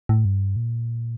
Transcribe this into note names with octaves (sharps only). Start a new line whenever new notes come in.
A2
G2
A#2